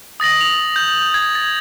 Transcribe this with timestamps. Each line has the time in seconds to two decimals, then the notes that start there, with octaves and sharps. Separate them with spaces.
0.20 D#6 A6 A#6 F#7
0.41 F7
0.76 G6
1.14 G#6
1.35 A6